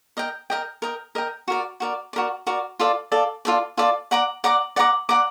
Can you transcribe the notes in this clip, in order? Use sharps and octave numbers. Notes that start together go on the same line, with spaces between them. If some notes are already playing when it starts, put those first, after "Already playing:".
A#4 D#5 G5
A#4 D#5 G5
A#4 D#5 G5
A#4 D#5 G5
F#4 A#4 D5
F#4 A#4 D5
F#4 A#4 D5
F#4 A#4 D5
F4 A4 D5
F4 A4 D5
F4 A4 D5
F4 A4 D5
D5 F#5 A#5 D6
D5 F#5 A#5 D6
D5 F#5 A#5 D6
D5 F#5 A#5 D6